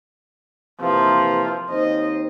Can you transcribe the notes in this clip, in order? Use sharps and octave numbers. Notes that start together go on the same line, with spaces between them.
C3 E3 F3 A#3
D#2 C4 C5 D#5